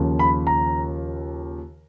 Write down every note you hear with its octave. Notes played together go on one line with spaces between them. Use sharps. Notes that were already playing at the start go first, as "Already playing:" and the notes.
Already playing: D#2 C#3 F3
B5
A#5